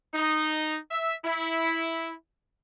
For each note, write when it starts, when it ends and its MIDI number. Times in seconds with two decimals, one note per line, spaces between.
0.14 0.77 63
0.91 1.13 76
1.25 2.10 64